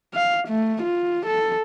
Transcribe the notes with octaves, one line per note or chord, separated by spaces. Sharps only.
F5
A3
F4
A4